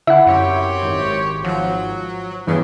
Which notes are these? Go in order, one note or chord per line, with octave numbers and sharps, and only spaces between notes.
D3 E4 E5 F#5
F#2 C4 G4 C#5
G#1
F3 F#3
E2 G2 C#3 E3